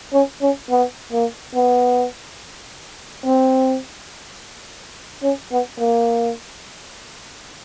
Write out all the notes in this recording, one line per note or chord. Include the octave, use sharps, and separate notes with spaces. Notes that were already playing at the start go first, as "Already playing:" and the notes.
C#4
C#4
B3
A#3
B3
C4
C#4
B3
A#3